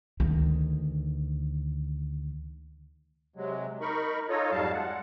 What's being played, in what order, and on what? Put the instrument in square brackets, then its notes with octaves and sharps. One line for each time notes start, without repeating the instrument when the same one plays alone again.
[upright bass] D2 D#3
[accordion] C3 F#3 G#3
D#4 A#4 B5 C#6
D#4 F4 A4 C#5 D#5
F2 G#2 F#3 G3 F5 A5
G#3 F#5